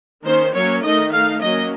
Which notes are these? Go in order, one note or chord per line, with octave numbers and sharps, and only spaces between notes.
D#3 A#3 C#4 C5
F#3 A#3 C#4 C#5
D#3 A3 D#4 D#5
A3 D#4 F5
F#3 A#3 C#4 D#5